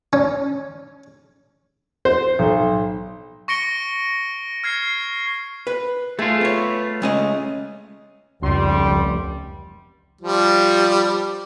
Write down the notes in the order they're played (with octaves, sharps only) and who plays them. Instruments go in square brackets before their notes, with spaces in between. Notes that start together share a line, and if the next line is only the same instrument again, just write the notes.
[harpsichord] C#4
[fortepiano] C5
B1
[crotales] C#6 A#6 C#7 D7 G7
F6 G#6 C7
[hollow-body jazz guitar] B4
[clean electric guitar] A3 F4 [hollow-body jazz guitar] G#4
[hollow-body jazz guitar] B3 C#5
G#3 C#4 D#5
[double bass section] F1 [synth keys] C#2 C6 [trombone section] G3
[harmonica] F3 G3